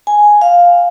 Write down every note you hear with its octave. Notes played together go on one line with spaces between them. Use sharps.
G#5
F5